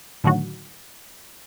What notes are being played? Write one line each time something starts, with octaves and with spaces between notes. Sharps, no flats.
A2 D3 D#3 F#3 F#4